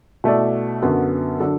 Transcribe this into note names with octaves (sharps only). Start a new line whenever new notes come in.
B2 A3 E4 D5
F#2 D3 B3 F#4
D3 F#3 D4 A4